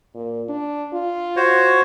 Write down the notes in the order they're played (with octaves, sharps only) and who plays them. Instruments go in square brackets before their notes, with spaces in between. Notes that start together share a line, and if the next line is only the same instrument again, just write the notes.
[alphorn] A#2
D4
F4
[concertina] F#4 C5 C#5